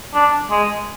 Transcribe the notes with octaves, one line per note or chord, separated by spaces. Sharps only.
D4
G#3